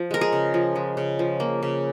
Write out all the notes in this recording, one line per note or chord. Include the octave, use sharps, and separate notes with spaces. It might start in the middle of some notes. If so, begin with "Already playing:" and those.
Already playing: F3
G#3 A#4
G#4
C#3
F3
G#3
C#3
F3
A#3
C#3